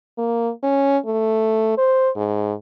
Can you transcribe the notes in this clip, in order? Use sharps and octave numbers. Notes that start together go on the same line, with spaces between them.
A#3
C#4
A3
C5
G#2